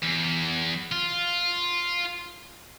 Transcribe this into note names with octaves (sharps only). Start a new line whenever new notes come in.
E2
F4